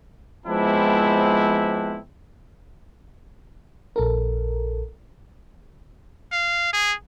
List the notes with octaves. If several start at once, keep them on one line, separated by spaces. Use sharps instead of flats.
F3 G#3 B3 C4 D4 E4
A#1 A4 A#4
F5
G#4